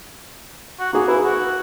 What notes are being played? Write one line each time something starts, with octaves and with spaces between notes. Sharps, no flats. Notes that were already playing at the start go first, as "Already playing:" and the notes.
F#4
A#3 F#4 G#4
E4 B4
F#4